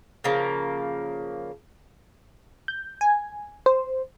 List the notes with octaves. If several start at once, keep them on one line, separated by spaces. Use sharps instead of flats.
C#3 F3 A#3
G6
G#5
C5